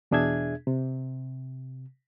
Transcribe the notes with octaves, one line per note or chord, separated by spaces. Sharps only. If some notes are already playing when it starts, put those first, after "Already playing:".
E2 B2 D4 G#4 E5 G#6
C3